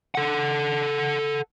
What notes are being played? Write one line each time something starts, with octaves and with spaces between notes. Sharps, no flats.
A4 F#5